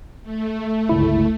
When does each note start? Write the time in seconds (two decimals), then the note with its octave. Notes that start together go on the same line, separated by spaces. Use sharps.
0.23 A3
0.89 G1 C#2 E4